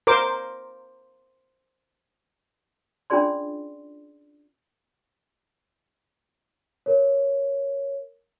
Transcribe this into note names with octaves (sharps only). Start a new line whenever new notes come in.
A#4 C5 D6
C#4 D4 F4 G#4 D5 C6
A#4 C#5